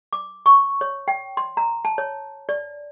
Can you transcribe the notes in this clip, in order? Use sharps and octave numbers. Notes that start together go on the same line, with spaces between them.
D6
C#6
C#5
G5
C6
A#5
A5
C#5
D5